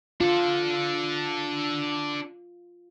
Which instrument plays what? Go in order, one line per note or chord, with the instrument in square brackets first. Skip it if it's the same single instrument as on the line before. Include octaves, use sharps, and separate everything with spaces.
[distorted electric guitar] D4 A4 [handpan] F4